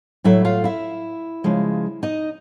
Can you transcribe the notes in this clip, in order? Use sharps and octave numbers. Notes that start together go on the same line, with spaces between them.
A2 F#3 A3 E4 E5
F4 F5
E4 E5
C#3 F3 G#3
D#4 D#5